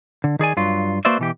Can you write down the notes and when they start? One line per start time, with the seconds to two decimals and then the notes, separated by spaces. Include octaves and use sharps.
0.24 D3
0.39 D#3 G#4 D5 G#5
0.57 G2 F#3 F4
1.05 A#3 F#4 B4 C5 D5 E5
1.19 B2 E3 G4